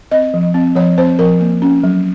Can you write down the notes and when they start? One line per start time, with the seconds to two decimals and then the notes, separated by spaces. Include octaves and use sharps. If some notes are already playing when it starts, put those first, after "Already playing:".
0.12 C4 D#5
0.34 F3
0.54 C4
0.76 F3 C#5
0.98 C4 C5
1.19 F3 A#4
1.40 A#3
1.62 C#4
1.83 F#3